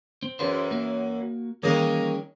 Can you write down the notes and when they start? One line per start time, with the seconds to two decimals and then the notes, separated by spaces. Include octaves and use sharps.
0.23 C4
0.39 F#2 E3 G#4 B4 C5
0.71 A#3 F#4
1.63 D#3 E3 G3 A#3 C#4 G#4 D#5